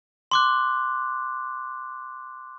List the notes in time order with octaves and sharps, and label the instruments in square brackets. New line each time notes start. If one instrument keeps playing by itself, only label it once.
[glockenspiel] C6 D6 F#6